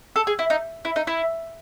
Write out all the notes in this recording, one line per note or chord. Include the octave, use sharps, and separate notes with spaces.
A4
G#4
E4
D#4
E4
D#4
E4